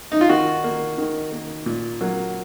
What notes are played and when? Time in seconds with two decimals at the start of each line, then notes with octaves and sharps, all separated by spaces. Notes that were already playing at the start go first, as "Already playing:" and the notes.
0.12 D#4
0.21 F4
0.29 D#3 F#4
0.64 A#3
0.98 D#3
1.32 A#3
1.66 A#2
2.01 F#3 A#3